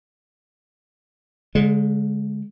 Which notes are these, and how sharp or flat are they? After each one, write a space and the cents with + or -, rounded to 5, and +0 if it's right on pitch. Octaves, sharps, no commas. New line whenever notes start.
D3 -40 G#3 +0